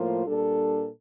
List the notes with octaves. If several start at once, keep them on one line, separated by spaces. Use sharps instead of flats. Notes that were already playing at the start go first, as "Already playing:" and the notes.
Already playing: A2 F3 A#3 F4 C5
A#2 G3 D4 A4